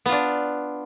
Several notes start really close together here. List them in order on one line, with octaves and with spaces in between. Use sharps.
B3 F4 D4